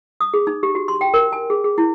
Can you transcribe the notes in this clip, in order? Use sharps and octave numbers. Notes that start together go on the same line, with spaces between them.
D#6
G#4
D#4
G4
F#4
C6
G5
A#4
G#5
G#4
G#4
E4